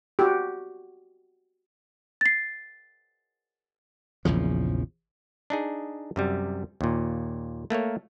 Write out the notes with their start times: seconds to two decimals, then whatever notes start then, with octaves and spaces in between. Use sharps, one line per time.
0.19 F#4 G4
2.21 A6 C7
4.25 A#1 E2 C#3 F3
5.50 D4 D#4 G#4
6.16 F#2 C3 G3
6.81 D#2 A#2
7.70 A3 A#3 A#4 C#5